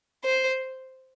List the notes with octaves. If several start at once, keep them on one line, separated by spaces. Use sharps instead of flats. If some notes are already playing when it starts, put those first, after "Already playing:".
C5